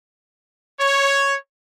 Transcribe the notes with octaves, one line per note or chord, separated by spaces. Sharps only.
C#5